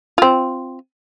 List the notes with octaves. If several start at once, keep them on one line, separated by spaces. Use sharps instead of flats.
C4 F4